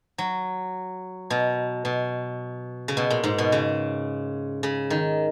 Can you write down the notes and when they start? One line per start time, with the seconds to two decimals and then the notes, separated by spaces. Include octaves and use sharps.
0.18 F#3
1.30 B2
1.85 B2
2.88 C#3
2.97 B2
3.10 A#2
3.24 G#2
3.38 B2
3.52 C#3
4.63 C#3
4.90 D#3